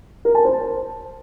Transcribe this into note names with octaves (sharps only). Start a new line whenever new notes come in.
A#4
A5
C5